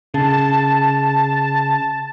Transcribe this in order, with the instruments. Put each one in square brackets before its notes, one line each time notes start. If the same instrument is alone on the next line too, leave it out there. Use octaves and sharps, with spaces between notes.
[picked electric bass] C#3 [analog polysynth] A5